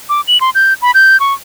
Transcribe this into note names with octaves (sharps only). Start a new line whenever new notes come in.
D6
F#7
C6
G6
B5
G6
C#6